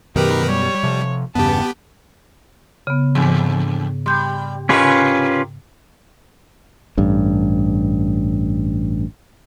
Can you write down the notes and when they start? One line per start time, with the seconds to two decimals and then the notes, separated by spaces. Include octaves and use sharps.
0.16 F#2 B2 D#3 G4 A#4 B4
0.49 G3 C#5
0.83 C3 F3
1.35 E2 G2 C#3 B3 G4 A5
2.87 C#3 B3
3.15 E2 G#2 D3
4.06 G3 C6 G6
4.69 C3 C#4 F4 G4 A#4 B4
6.97 A1 G2